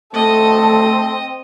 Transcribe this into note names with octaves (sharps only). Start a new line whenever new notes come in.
A3 C4 A4 D#5